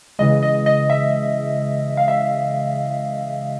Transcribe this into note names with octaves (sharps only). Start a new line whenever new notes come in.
C#3 E3 G#3 D#5
D#5
D#5
E5
F5
E5